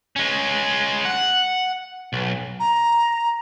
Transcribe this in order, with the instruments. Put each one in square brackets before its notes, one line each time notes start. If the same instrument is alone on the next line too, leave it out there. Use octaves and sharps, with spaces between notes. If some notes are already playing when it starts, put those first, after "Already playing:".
[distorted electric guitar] G#3 C#4
F#5
B1
[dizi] A#5